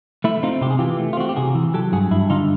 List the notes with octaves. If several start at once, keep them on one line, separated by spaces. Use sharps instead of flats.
A3 E4
C4 D#4 F4
C3 G4
G#4
E3 F4 G4
A3
F4
C4 F#4
G4
C3 F#4 G#4
E3
F#3 G4 A4
G2 F#4 G#4
G2 E4
D3 D#4 F4